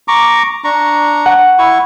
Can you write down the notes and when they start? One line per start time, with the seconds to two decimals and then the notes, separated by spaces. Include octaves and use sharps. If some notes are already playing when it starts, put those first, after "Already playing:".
0.08 A#5 C#6 D6
0.64 D4 A#5 C#6
1.26 F#5
1.59 E4 C#6